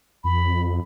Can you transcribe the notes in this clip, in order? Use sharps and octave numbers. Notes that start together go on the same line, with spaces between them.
F2 B5